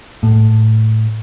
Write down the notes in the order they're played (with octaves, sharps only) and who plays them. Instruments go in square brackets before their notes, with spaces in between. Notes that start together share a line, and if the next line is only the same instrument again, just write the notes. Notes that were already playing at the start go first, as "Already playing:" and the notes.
[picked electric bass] A2